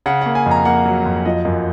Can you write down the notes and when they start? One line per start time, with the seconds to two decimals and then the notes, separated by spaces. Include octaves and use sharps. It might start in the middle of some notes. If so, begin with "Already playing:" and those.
0.06 C#3 F#5
0.21 A#3 F#5
0.35 G#5
0.46 F2
0.51 A#5
0.65 A#3 F#5
0.85 F#3
1.06 F2
1.25 F3 D#5
1.45 F#2